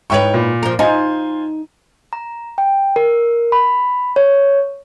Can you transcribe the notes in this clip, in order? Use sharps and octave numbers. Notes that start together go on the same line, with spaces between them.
G#2 E4 B4 C#5 G5 C#6
A#2
F3 A#4
D#4 F4 C5 G#5
A#5
G5
A#4
B5
C#5